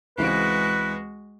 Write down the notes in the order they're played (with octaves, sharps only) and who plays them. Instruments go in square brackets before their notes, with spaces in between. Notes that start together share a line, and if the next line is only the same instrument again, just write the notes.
[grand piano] C#2 E3 C4 [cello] G#3 F#4 [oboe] B4